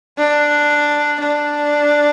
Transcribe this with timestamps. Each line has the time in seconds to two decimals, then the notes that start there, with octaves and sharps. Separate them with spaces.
0.18 D4
1.20 D4